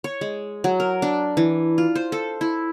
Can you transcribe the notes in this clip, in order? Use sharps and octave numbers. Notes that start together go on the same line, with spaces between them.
C#5
G#3
F#3
A#4
D4
E3
F4
C5
A4
E4